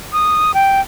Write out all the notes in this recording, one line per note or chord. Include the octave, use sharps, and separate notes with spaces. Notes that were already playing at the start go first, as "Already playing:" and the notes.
D#6
G5